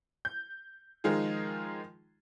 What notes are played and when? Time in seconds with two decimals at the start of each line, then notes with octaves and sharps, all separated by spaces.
0.25 G6
1.04 D#3 F3 G#3 D#4 F4 G#4